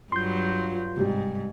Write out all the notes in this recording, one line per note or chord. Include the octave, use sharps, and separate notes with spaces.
G2 F#3 F4 C6 G6
G#2 C3 G3